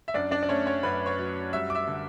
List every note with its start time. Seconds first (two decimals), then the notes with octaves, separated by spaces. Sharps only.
0.08 E5
0.14 F#2 D4 D5
0.31 D4 D5
0.43 D5
0.49 A3 C#4 C#5
0.66 C#4 C#5
0.83 F#2 B4 B5
1.06 C#5 C#6
1.18 F#3
1.53 G3 E5 E6
1.70 D6
1.75 E5 E6
1.87 D3